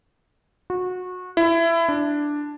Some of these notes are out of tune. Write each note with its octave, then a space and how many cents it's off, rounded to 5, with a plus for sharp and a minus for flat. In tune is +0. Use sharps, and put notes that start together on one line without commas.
F#4 -25
E4 +20
D4 +0